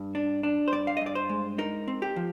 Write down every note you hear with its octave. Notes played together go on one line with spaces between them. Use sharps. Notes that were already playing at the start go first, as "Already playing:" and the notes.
Already playing: G2
D4
D4
C5
G2 D5
F5
D#5
G2 D5
C5
G#3
D#4 A#4
C4
G4
F3